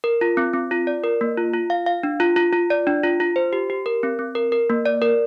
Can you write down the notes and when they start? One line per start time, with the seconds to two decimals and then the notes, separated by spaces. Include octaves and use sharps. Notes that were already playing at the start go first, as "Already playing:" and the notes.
0.04 A#4
0.21 F4
0.37 C4
0.53 C4
0.71 F4
0.87 D5
1.04 A#4
1.21 A#3
1.38 F4
1.53 F4
1.70 F5
1.86 F5
2.03 D4
2.20 F4
2.36 F4
2.53 F4
2.70 D5
2.87 D4
3.03 F4
3.20 F4
3.36 C5
3.53 G4
3.70 G4
3.86 A#4
4.03 C4
4.19 C4
4.35 A#4
4.52 A#4
4.70 A#3
4.86 D5
5.02 A#4